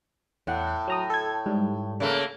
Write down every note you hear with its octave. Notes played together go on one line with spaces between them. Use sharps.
E2 A2 F#5
F#3 A#5 D#6
A4 G#6
G#2 G3
C#3 A3 A#3